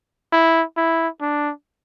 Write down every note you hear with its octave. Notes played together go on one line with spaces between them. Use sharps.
E4
E4
D4